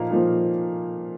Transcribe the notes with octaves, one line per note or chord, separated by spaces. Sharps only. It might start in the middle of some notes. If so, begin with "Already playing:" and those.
Already playing: A#2 F3 A#3 D#4 F5
A#2 F3 A#3 D#4